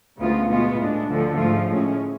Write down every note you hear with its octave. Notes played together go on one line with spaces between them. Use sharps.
D2 C#3 G#3 B3 F4
B2 G#3 B3 F4
A2 G#3 D4
D2 D3 F3
G#2 F3 A3 F4
A2 G#3 C#4